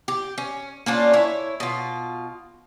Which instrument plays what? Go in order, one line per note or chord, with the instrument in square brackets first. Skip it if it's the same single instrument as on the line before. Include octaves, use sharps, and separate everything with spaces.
[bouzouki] G4
C#4
A#3 C#4 D4 F4
E4 C#5
B2 F4